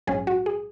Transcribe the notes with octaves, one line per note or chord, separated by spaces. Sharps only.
A#1 G#2 F#3 C#4 G#4
F#4
G#4